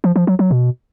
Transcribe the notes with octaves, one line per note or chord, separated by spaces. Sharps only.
F3
F3
F#3
F#3
B2